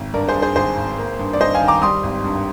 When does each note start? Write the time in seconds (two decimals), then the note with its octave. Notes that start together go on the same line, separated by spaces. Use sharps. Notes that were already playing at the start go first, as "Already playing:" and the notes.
Already playing: G#1
0.14 G2 A#4 D5
0.29 G#4 C5
0.36 G2
0.42 G#4 C5
0.56 G#1 G#4 C5
0.77 G#1
0.98 A#3
1.19 G2
1.33 D5
1.40 G2 C5 D#5
1.55 F5 G#5
1.61 D#3
1.68 A#5 D6
1.82 G3 C6 D#6
2.03 G#1
2.24 G2